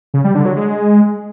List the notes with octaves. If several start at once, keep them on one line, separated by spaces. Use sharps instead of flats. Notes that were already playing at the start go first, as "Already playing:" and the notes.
C#3
G3
D3
F#3
G#3